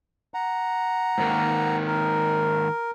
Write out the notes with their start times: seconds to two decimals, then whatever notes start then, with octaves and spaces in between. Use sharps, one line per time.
0.34 F#5 A#5
1.18 G#2 D#3 A#3
1.87 A#4